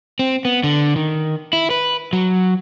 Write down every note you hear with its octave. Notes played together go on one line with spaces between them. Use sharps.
C4
B3
D3
D#3
E4
B4
F#3